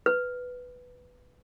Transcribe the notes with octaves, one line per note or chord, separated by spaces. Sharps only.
B4